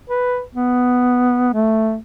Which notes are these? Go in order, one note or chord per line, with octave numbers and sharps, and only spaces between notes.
B4
B3
A3